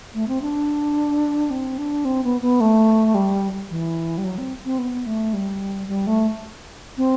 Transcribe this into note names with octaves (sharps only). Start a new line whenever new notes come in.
A3
C4
D4
C4
D4
C4
B3
B3
A3
G3
E3
G3
F#3
C4
C4
B3
A3
G3
G3
A3
C4